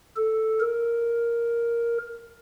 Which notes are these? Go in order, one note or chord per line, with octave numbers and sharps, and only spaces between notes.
A4
A#4